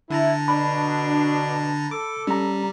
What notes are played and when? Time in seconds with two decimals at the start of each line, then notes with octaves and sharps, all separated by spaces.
0.10 D3 E4 A5 A#5
0.48 B2 D4 B5
1.91 A4 D6
2.27 G3 C#4 A#5